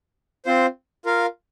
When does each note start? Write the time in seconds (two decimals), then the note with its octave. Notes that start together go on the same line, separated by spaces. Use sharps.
0.45 C4 F4 C5
1.05 F4 A#4 F5